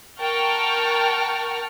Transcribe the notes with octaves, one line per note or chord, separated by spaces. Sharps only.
A#4 F#5 G5 A5 C#6 F6